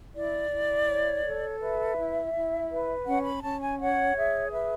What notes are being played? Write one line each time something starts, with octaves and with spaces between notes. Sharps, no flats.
E4 D5
E4
C#5
A4
B4 E5
E4
E4
B4
C#4 F#5
B5
C#4 A5
G#5
C#5 F#5
G#4 E5
B4 E5